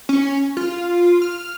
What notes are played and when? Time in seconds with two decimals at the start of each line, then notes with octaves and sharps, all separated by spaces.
0.09 C#4
0.57 F4
1.22 F6